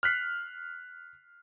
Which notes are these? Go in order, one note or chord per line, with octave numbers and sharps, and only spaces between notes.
F6 F#6 B6 C7